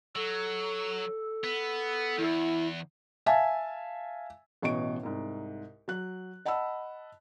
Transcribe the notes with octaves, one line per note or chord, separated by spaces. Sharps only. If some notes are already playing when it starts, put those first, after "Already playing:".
F#3 A4
B3
E2 E4
E5 F5 G#5 A5
A1 B2 D#5 C#6 D7
C2 G#2
F#3 F#6
D#5 F#5 A5 B5 E6